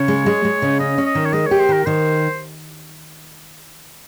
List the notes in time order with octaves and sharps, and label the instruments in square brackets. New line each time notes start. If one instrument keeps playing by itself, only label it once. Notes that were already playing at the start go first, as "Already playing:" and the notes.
Already playing: [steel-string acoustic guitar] C#3 [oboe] C#5
[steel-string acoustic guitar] G#3
G#3
G#3
C#3
[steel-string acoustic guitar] C#4 [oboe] D#5
[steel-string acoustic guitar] C#4
[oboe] D#5
[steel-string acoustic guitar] D#3
[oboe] C#5
[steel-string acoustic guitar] G#3 [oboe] D#5
[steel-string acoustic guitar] G4 [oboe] C#5
[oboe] C5
[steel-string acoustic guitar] D#3 [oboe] A#4
[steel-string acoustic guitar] D#3 [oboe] C5